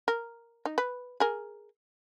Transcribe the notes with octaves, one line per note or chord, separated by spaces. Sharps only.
A#4
D#4
B4
G#4 A#4